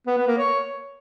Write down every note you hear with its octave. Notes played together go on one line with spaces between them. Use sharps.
B3
B3
A#3
C#5